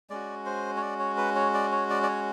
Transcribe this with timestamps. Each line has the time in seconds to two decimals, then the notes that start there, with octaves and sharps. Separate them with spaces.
0.10 G#3 C#4 F#4 D5
0.46 C5
0.77 C#5
0.82 D5
0.99 C#5
1.17 B4
1.36 C#5
1.54 D5
1.72 C#5
1.90 D5
2.03 D5
2.08 C#5